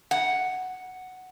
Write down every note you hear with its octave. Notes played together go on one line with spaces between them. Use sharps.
F#5